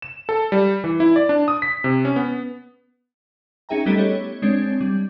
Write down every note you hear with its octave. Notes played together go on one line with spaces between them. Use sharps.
E7
A4
G3
E3
E4
D5
D4
D#6
B6
C3
C#4
B3
C#4 D#4 G#4 E5 G5 A#5
G3 A3 B3 G4 A4 D#5
C#5
G#3 C4 D4 C#5
G3